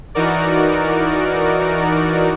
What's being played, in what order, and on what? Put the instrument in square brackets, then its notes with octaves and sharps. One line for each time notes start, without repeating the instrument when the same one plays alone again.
[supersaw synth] E3 D#4 F#4 A#4 D5